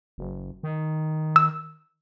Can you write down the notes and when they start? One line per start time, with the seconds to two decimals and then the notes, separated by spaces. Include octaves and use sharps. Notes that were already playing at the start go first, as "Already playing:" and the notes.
0.18 F#1
0.63 D#3
1.36 E6